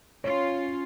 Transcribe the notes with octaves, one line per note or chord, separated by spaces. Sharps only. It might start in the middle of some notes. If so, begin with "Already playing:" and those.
C#4 F4 C#5